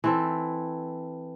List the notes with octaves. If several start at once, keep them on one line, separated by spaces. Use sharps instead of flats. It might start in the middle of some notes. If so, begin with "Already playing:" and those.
E3 C4 A4